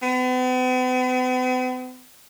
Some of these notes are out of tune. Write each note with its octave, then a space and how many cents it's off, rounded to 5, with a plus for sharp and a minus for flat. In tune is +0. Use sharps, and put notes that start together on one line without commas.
B3 +45